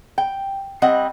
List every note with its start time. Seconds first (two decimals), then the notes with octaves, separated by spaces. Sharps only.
0.18 G5
0.82 G3 C4 D#5 F#5